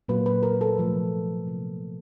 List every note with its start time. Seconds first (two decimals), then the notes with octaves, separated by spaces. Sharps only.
0.08 A#2 F#3 A#3 B4
0.26 B4
0.43 A#4
0.61 A4
0.78 C3 F3 A3 A#4
1.46 C3 F3 A#3